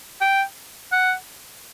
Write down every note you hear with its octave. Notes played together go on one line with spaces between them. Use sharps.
G5
F#5